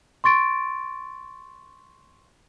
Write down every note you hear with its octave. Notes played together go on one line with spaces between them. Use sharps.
C6 C#6 A6 D7